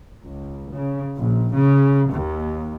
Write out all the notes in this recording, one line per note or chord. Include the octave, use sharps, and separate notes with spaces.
C#2
C#3
A#1
C#3
D#2